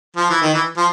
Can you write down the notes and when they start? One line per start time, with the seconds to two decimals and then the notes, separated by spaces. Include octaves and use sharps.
0.16 F3
0.30 E3
0.42 D#3
0.54 E3
0.77 F3